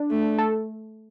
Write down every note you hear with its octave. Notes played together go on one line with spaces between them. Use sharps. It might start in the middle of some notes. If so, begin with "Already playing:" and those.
Already playing: D4
A3
A4